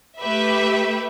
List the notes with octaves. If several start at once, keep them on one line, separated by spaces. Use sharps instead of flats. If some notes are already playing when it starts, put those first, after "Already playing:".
A3 G4 B4 E5